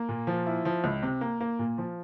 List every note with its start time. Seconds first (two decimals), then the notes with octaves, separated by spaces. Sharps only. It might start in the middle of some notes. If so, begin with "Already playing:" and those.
Already playing: A#3
0.09 A#2
0.27 F3
0.46 E4
0.65 F3
0.84 C#2
1.02 C3
1.21 A#3
1.40 A#3
1.59 A#2
1.78 F3